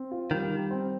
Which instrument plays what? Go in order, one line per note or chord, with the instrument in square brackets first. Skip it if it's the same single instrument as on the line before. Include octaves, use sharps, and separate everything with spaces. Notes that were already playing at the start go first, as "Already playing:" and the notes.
Already playing: [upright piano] C4
F4
[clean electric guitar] D#3 [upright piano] G3
[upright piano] G3
C4